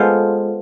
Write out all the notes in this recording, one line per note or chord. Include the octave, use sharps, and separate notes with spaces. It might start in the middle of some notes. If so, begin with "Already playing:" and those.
Already playing: G#3 B3 F4 A4 C5